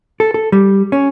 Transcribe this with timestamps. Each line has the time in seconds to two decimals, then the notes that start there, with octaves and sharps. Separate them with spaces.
0.20 A4
0.34 A4
0.52 G3
0.92 C#4